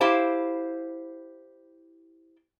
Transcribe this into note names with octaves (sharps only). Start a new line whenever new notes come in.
E4 G4 C5 F5 A5